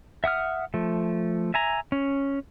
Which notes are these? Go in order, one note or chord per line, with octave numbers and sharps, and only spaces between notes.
E5 F#5 D#6 F6
F3 A3
E5 G#5 A#5
C#4